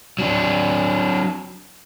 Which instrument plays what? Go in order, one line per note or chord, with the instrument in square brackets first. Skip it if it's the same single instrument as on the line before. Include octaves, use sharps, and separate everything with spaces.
[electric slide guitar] F#3 D4